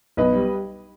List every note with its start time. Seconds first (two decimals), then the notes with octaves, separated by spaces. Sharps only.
0.17 B1 B4 D#5
0.33 G3